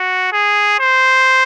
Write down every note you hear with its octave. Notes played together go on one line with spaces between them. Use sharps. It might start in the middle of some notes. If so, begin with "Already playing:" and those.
Already playing: F#4
G#4
C5